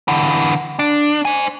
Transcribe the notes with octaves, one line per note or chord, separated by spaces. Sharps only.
D3 E3
D4
C5 G#5